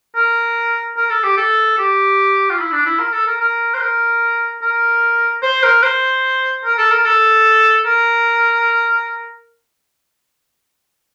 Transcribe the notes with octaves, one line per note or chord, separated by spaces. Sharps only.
A#4
A#4
A4
G4
A4
G4
F4
E4
D4
E4
A#4
A4
A#4
A#4
C5
A#4
A#4
C5
A#4
C5
A#4
A4
A#4
A4
A#4